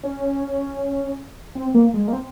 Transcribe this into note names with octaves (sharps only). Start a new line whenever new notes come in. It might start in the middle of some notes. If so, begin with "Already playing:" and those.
C#4
C4
A#3
G#3
A#3
C4